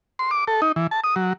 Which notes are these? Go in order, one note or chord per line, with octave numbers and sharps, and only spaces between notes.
C6
D6
A4
D#4
E3
A5
D#6
F#3